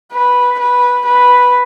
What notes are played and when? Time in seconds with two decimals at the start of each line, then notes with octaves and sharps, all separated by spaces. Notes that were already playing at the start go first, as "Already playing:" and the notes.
0.13 B4
0.59 B4
1.06 B4